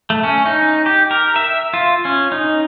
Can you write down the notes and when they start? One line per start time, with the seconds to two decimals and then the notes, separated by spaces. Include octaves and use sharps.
0.10 A3
0.23 C#4
0.46 D#4
0.86 G4
1.11 A#4
1.36 E5
1.74 F4
2.05 C#4
2.32 D#4